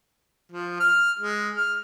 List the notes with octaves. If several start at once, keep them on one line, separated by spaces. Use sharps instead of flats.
F3
F6
G#3
F6